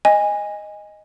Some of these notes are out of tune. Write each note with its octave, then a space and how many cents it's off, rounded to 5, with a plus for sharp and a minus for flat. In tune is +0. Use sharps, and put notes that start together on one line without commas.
D#5 +0 G#5 -20